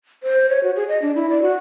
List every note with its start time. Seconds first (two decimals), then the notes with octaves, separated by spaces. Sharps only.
0.23 C5
0.49 C#5
0.63 F#4
0.76 G#4
0.88 D#5
1.02 D4
1.15 E4
1.30 D5
1.42 F#4